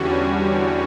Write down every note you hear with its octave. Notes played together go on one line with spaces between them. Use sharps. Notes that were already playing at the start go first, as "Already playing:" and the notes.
Already playing: E2 D3 G3 C#4 F#4